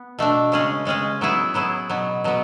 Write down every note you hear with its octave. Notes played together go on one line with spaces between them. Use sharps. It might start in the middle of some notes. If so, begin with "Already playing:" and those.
Already playing: B3
B2 A3 D4
C#3 G#3 C#4 G#4
C#3 G#3 C#4 G#4
F#3 B3 E4 G#4
F#3 B3 E4 G#4
B2 F#3 B3
B2 F#3 B3